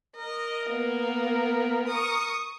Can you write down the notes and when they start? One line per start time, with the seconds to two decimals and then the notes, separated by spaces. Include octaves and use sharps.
0.16 A#4 D#5
0.66 A#3 B3
1.88 C#6 D#6